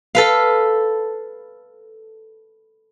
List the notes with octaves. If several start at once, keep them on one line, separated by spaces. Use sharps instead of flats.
A4 B4 F5